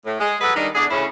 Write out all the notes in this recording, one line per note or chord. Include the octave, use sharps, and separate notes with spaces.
A2
G#3
F#3 G#4 A4 B4
D#3 G3 G#3 D4 D#4
E2 D3 D4 G#4
D2 A2 C#3 C#4 E4